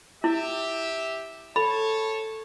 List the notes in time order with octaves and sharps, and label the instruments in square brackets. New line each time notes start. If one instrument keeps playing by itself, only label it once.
[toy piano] E4 [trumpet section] G4 E5
[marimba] A4 [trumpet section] C#5 A5 [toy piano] B5